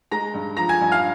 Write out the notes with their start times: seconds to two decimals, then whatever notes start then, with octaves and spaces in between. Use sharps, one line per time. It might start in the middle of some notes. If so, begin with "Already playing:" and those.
0.11 G#3 A#5 A#6
0.34 G2
0.57 F3 A#5 A#6
0.69 G#5 G#6
0.81 G2
0.92 F5 F6